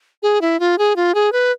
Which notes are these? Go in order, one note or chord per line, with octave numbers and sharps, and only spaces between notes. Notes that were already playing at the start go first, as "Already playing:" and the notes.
G#4
E4
F4
G#4
F4
G#4
B4